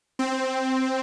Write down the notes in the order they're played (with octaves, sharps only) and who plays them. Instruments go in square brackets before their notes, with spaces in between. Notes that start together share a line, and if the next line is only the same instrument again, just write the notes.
[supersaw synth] C4